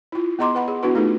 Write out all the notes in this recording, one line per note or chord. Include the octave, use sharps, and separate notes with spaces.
E4 F4
B3 G#4 D#5 A#5 C6 D6
B4 F#5 B5
G#4
B3 D4 E4 F#4 B4
A3 D#4 F4 G#4 A4 B4